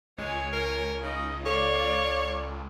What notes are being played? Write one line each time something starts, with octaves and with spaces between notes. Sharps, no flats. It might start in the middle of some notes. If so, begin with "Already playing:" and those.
C#2 G#3 C#5 G#5
A#4 C7
C#3 D#4 D#5
A4 C#5 D5 F5